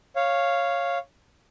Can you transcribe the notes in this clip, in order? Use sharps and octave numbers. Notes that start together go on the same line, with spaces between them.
C#5 F5